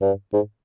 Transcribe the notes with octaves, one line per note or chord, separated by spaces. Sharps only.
G2
G#2